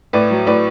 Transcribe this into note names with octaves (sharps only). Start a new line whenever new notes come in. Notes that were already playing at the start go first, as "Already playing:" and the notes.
A2 B4 D5
F#3
A2 B4 D5